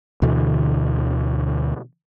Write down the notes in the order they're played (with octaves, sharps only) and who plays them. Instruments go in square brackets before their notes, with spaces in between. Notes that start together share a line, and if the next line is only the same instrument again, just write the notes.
[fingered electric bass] D2 B2 D3 E3